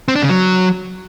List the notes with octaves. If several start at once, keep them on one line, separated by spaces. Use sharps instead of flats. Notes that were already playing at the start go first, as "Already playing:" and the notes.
C4
D4
C#3
F#3